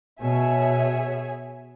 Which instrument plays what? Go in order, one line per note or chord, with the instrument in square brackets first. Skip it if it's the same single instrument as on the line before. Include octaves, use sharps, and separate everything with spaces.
[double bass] B2 [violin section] G#4 C#5 E5 G#5